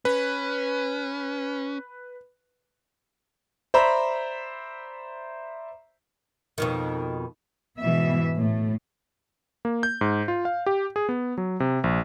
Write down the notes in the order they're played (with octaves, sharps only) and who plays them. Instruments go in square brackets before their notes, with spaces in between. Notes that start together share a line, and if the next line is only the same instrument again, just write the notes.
[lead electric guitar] C#4 [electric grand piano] B4
[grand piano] C5 D5 E5 A#5 B5
[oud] F2 B2 D#3
[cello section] G#2 B2 E3 B3 E5
A2 A3
[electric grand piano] A#3
G6
G#2
F4
F5
G4
G#4
B3
F#3
C3
A#1